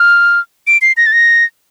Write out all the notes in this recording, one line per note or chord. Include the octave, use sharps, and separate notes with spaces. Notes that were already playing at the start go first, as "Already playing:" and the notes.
Already playing: F6
D7
C7
A#6
A6
A#6